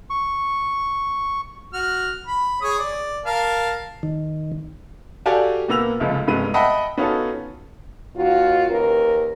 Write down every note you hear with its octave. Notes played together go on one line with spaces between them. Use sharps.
C#6
F#4 F6
B5
G#4 C#5 D#6
D5
A#4 F5 A5
D#3
F#4 G4 A4 D5 F5 G#5
A#2 A#3 B3 E6 F7
F1 C#2 F3 G#3
F1 G2 G#3 B3 D#7
D#5 E5 F#5 G5 A5 B5
B3 C#4 D#4 F4 F#4 A4
D#2 F4 F#4
D#2 C#4 A#4 B4